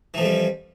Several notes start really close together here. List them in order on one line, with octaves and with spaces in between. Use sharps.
E3 F3 F2 G3